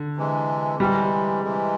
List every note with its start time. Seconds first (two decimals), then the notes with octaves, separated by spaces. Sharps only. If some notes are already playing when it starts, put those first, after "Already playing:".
Already playing: D3
0.16 C3 E3 G#3
0.79 C3 E3 G3 G#3
1.44 C3 E3 G#3